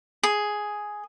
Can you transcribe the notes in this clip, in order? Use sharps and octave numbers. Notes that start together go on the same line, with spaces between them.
G#4